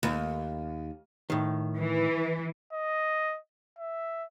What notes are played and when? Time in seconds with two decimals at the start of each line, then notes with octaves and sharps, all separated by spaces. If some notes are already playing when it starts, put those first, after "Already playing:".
0.03 D#2
1.30 A2 D#3
1.78 E3
2.73 D#5
3.79 E5